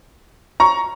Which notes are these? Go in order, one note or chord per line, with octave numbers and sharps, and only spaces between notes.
A#5 C#6